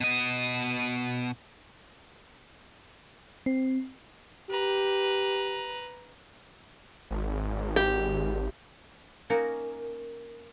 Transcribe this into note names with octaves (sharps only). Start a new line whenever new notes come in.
B2 D#5
C4
G4 B4 A#5
G#1
G4
A#3 C#4 D#4 F#4 A#4